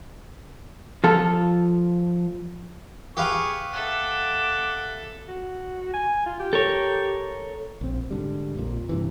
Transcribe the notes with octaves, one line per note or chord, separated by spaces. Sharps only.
F3 F4 A4
G4 G#4 B4 F5 C#6
A4 E5 F#5 D6
F#4
G#5
F4
G4
A4 A#4 C#5
A#1 C4
G#2 D3 G3
A#1 F2 A#2
G2 C3 E3